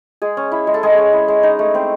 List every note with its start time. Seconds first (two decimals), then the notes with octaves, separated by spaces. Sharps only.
0.22 G#3 G#4
0.37 C#4
0.52 E4
0.67 G#3
0.74 A4
0.83 G#3 G#4
0.98 C#4
1.13 E4
1.28 G#3
1.43 D#4
1.59 A3
1.75 C4